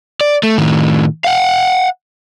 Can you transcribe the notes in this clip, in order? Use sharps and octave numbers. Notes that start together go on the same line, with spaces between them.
D5
A3
A2 D#3
F5 F#5